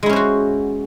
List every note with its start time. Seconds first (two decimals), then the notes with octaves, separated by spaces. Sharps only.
0.03 G#3
0.06 E4
0.09 C#4
0.13 C5
0.16 F#4